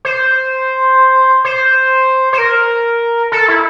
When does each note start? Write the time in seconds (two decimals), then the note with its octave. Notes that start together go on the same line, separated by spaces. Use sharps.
0.05 C5
1.45 C5
2.33 C5
2.38 A#4
3.32 A4
3.48 E4